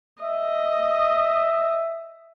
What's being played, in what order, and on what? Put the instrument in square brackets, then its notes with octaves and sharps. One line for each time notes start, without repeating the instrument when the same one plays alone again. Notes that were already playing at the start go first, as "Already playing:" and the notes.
[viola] D#5 [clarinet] E5